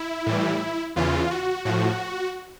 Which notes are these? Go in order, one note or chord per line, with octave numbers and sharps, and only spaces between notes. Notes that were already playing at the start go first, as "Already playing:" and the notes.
Already playing: E4
A2 E3 G3
E2 C#3 E3 F4
F#4
A2 F3 F#4